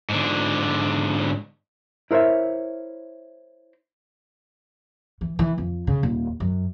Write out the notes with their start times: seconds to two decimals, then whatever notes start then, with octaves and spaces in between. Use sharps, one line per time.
0.09 G#2 D3
2.11 E4 A#4 C5 C#5 E5
5.21 E3
5.39 E3
5.58 F2
5.87 C#3
6.03 D#1
6.40 F#2